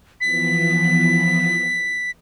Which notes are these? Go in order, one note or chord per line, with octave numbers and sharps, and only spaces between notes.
E3 F3 B3 B6